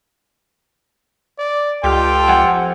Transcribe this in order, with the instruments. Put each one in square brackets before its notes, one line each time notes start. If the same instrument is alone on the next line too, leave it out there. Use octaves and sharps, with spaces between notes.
[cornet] D5
[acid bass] C#2 [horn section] F4 G4 A4 [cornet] G5
[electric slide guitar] F2 F#5 G#5